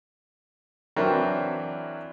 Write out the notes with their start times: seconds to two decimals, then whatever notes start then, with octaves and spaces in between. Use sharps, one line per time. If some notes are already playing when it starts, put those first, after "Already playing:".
0.96 E3 F#3 C4 D4 E4 A#4